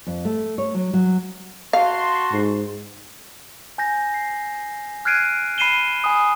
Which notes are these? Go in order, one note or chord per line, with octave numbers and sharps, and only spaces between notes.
F2
A3
C#5
F#3
F#3
F#4 F5 A5 C6
G#2
G#5 G6 A#6
C7
F6 F#6 G#6 C7 D7 D#7
B5 C7 D#7 E7 G7
G#5 B5 D#6